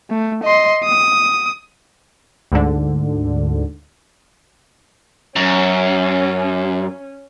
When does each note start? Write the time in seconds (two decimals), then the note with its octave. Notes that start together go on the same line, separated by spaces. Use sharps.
0.10 A3
0.44 D#5 C6
0.84 D#6
2.52 D2 G#2 D3
5.36 F#2 C#4